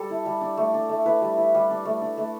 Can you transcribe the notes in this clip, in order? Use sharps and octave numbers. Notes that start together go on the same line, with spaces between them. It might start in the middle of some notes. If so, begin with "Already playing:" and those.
Already playing: G3 A4
E4
G3
D4
A3
D4
A3
E4 B4
G3
E4
G3
D4
A3
D4
A3